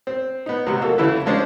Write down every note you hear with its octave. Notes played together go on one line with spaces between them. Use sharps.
C4
B3 D#4
G#2 C3 F#3 B3 D#4
A#3 F4 F#4 A4
C#3 E3 E4 F#4 A4 B4
F3 G#3 C#4 D4 C5